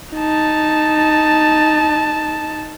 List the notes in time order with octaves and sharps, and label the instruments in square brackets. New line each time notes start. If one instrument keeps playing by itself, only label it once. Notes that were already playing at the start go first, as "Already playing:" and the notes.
[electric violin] D#4 A5